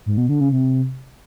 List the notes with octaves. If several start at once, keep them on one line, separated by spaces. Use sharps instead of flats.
G#2
B2
D3
C#3
C3